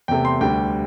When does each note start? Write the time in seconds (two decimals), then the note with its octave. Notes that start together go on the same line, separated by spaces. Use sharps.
0.08 E2 C3 A3 G5
0.25 C6
0.41 D2 D3 G3 G5